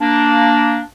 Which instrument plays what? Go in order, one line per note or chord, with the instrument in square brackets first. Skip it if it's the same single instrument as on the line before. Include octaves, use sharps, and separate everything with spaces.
[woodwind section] A#3 D4